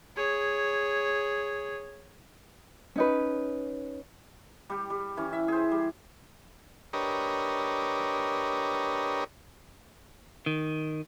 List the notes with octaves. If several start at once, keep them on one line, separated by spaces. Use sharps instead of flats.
G#4 C#5
C#4 D#4 B4
G3 G4
G3
E3 C#4
E5
G#4 C5
G3
D4 G4 A#4 B4 C#5 D#5
D#3